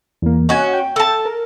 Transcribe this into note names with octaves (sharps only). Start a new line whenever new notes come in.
E2 A#3
C#4 F#4 D#5 F#5 G#5
G5
A4 A5
A#4